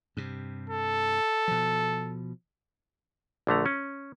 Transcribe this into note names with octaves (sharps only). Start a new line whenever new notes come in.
G2 C3
A4
B2 F3
A#1 D3 A3 A#5
C#4